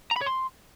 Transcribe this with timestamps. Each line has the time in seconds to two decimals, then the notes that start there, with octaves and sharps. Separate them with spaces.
0.11 A#5
0.16 B5
0.21 C#5
0.26 C6